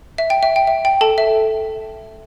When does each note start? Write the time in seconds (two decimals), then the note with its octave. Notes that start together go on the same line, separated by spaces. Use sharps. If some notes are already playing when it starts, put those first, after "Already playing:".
0.18 E5
0.30 G5
0.43 E5
0.56 G5
0.67 E5
0.85 G5
1.01 A4 A5
1.18 E5